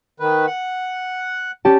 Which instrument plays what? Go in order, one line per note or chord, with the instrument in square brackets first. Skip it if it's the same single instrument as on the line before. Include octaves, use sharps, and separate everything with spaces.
[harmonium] D#3 B4
F#5
[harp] C#4 G4 A5